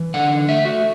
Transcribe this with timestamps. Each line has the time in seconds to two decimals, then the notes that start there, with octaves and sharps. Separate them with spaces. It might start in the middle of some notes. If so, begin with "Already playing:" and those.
Already playing: E3
0.14 D3 F#5
0.48 A3 E5
0.65 F#4